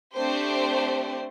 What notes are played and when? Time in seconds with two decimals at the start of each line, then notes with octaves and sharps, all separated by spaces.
0.15 A3 C4 D4 G4 C5